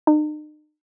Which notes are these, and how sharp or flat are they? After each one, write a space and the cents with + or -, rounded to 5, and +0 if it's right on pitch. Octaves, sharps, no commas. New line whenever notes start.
D#4 -45